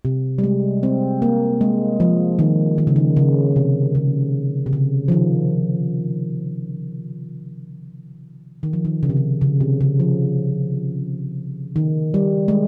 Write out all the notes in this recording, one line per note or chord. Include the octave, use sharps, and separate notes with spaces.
C3
G3
G#3
C4
A#3
G#3
F3
D#3
D#3
C#3
D#3
C#3
C3
C#3
C3
C#3
F3
D#3
D#3
F3
D#3
C#3
C3
C#3
C#3
C3
C#3
F3
D#3
G3
G#3